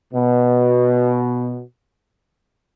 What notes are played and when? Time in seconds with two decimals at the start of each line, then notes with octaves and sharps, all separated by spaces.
0.12 B2